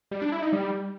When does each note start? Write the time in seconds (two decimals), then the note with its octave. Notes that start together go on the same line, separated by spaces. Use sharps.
0.11 G3
0.22 D4
0.32 E4
0.42 D#4
0.53 G3